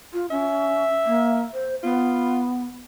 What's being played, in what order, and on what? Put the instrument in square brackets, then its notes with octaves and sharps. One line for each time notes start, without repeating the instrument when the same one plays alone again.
[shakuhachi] F4
[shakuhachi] C#4 [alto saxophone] E5
[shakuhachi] A#3
C5
[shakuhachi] B3 [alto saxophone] F4